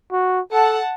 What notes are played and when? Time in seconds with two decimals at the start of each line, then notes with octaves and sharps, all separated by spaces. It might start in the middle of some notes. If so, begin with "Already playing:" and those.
0.12 F#4
0.52 A4 F#5 A5